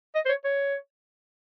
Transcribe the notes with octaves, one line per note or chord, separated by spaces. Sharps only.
D#5
C5
C#5
C#5